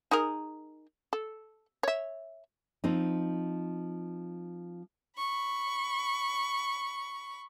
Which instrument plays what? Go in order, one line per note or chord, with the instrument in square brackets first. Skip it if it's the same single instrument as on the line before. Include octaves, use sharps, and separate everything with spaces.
[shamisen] D#4 G#4 A#4
A4
C#5 E5
[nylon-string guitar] F3 C4 D#4
[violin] B5 C#6